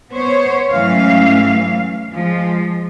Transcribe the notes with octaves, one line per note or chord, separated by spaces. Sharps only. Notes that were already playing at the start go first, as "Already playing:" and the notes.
B3 C5 C#5
G#2 E3 F#3 A3 C#4 F5
F3 G#3